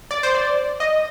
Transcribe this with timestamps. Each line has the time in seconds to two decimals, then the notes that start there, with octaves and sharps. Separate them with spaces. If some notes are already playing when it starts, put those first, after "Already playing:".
0.11 D5
0.23 C5
0.35 D5
0.80 D#5